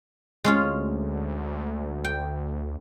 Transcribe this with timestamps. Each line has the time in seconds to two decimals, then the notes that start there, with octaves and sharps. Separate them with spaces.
0.44 D2 G#3 C#4 F4
2.04 G5